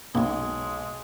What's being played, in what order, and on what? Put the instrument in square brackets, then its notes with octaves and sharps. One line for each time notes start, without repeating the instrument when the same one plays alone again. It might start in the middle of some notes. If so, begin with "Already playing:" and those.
[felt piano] B1 [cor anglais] G#3 [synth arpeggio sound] A#3 B3